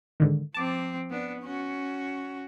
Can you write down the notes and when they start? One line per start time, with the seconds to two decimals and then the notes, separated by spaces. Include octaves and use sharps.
0.20 G#2 D3 D#3
0.54 F3 C4 A5 D6
1.10 B3 D4
1.41 C#4 F#4